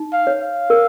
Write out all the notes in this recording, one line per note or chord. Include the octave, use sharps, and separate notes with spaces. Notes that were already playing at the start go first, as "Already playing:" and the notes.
Already playing: D#4
F5
C#5
F5
A#4